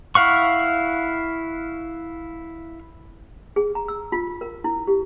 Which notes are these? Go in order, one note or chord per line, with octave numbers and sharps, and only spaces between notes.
E4 F5 F#5 C#6
G#4
A#5
E6
F4
A#4
E4
G4